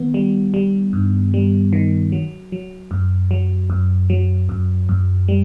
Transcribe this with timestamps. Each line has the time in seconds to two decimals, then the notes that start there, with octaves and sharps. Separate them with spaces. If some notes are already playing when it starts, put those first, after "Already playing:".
Already playing: D#3 B3
0.14 G3
0.54 G3
0.93 G2
1.34 G3
1.73 D#3
2.12 F#3
2.52 F#3
2.91 F#2
3.31 F#3
3.70 F#2
4.10 F#3
4.49 F#2
4.89 F#2
5.28 G3